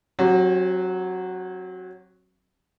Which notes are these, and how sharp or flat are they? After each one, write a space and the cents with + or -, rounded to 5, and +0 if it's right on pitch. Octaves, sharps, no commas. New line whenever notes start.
F#3 +0 C4 +45 G4 +0